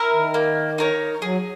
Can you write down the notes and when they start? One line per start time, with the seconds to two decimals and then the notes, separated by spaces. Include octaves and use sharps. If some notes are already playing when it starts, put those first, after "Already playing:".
Already playing: E4 A#4
0.13 D#3
0.34 A#3
0.78 D#4 A#4 C#5
1.22 F#3 G#4